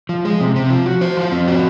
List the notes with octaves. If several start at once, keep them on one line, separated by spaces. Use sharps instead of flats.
F3
G#3
C3
C3
F3
F#4
C5
F3
C4
F#4